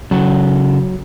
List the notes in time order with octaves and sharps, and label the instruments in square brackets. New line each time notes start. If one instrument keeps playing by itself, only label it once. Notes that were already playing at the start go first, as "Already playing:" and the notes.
[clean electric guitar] C#3 F#4 A4 [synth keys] F#3